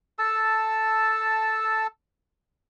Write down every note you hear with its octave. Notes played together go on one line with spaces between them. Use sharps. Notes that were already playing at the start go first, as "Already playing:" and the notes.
A4 A5 E6